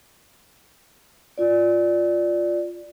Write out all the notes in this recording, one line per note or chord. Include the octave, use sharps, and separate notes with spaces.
F4 D5